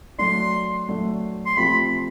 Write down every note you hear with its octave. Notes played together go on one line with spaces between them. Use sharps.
F#3 A3 D4 C6
F#3 A3 D4
C6
C3 F3 A3 B5